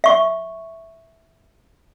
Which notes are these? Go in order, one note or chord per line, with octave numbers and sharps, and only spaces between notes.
E5 C#6